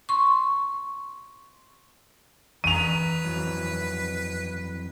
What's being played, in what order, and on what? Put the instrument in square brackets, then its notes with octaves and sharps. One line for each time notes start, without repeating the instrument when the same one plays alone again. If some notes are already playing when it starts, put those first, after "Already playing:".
[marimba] C6 C#6
[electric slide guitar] E3 A#5 [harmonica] B4 [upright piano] D#7 F7
[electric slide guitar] F2 E3 F#3